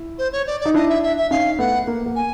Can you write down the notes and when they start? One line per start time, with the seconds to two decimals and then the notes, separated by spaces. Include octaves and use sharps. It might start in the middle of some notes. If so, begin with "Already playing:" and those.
Already playing: E4
0.18 C5
0.32 C#5
0.47 D5
0.60 D5
0.65 D#4
0.74 D4 E4 D#5
0.89 E5
1.02 E5
1.17 E5
1.30 C#4 D#4 F5
1.59 A3 B3 F#5
1.87 A#3
2.06 A#3
2.16 G#5